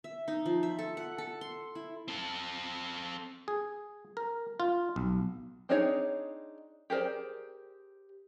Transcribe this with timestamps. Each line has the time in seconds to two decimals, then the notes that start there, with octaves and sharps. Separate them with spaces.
0.04 E5
0.28 D#4
0.46 F3
0.63 E5
0.79 A4
0.97 F#5
1.18 A4
1.41 C6
1.75 E4
2.08 C4 A4
3.48 G#4
4.17 A#4
4.60 F4
4.96 B1
5.69 C4 D4 D#4 G#4 C#5
6.90 G4 G#4 A#4 C5 D5